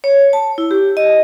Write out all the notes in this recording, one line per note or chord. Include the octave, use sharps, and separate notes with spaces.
C#5
A5
E4
G4
D#5